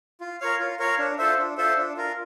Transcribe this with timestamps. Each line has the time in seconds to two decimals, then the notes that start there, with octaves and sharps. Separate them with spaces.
0.21 F4
0.40 A#4 C#5 F5
0.60 F4
0.80 A#4 C#5 F5
0.99 D4
1.18 F4 A4 C5 E5
1.38 D4
1.58 F4 A4 C5 E5
1.77 D4
1.97 F4 A#4